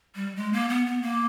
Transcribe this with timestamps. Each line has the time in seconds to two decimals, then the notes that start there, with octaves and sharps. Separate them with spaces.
0.15 G3
0.36 G#3
0.53 A#3
0.69 B3
0.86 B3
1.02 A#3